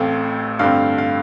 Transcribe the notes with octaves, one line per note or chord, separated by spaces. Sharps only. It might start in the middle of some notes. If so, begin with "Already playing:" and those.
Already playing: A1 A2 A3 C4 F5
G2 D3 A3 C4 F5
F5